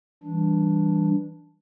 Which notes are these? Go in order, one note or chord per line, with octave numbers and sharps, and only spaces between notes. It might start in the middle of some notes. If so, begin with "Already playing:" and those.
E3 G3 D4